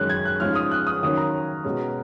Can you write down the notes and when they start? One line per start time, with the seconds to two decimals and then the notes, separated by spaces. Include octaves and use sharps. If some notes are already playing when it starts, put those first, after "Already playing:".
Already playing: F#2 D#3 G#3 C#4 F#6
0.10 G#6
0.26 F#6
0.40 G#2 F3 G#3 C#4 F6
0.55 D#6
0.71 F#6
0.87 D#6
1.03 D#2 D#3 F#3 A#3 C#4 D#6
1.17 A#5
1.64 B2 G#3 C#4